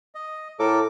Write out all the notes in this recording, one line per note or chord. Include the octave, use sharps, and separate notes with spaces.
D#5
A2 A4 A#4 D6